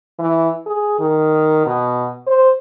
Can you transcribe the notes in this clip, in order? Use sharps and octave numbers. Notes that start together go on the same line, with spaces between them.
E3
G#4
D#3
B2
C5